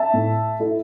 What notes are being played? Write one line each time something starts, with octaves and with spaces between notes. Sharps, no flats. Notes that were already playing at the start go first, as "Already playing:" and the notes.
Already playing: E5 A5
A2
A3 E4